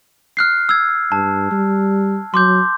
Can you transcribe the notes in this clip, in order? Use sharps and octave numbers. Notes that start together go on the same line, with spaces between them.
F6 F#6 C7
E6 G#6
G2 A5
G3
F#3 C6 D6 G6